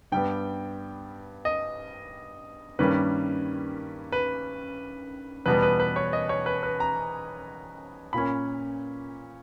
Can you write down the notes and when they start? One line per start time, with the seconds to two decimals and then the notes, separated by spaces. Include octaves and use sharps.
0.12 G2 G3 B3 G5
1.45 D#5
2.79 G2 D#3 G3 A#3 C#4 B4
4.12 B4
5.46 E2 B2 G3 B3 B4
5.62 B4
5.80 B4
5.96 C#5
6.13 D#5
6.29 C#5
6.46 B4
6.63 B4
6.80 A#5
8.13 A#2 A#3 C#4 B5